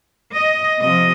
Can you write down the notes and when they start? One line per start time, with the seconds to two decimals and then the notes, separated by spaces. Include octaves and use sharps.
0.35 D#5
0.80 C3 F3 D#5